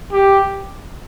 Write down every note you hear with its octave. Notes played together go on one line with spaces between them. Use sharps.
G4